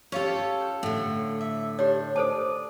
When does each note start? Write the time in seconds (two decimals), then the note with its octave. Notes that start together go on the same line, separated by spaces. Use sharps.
0.12 C#4 F4 G4 A4 C#5
0.83 A2 D3
1.41 E5
1.79 D4 G4 C#5
2.16 A4 C5 D5 A5